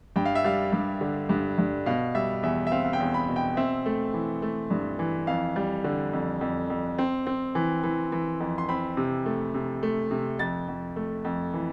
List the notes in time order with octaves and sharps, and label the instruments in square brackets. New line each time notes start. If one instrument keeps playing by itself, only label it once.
[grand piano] G2 G5
F5
E5
G3 F5
G2
D3
G2
G2
B2 F5
G3 E5
E2 E5
E5
C4 F5
F5
G5
E2
B5
B2
G5
C4 E5
A3
E3
A3
G2
E3
F2 F5
G3
D3
F2
F2
F2
C4
C4
E3
E3
E3
F2
C6
C4 B5
C3
A3
C3
A3
C3
F2 A6
F2
A3
F2
E3